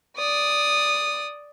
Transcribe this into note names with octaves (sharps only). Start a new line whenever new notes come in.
D5 D#6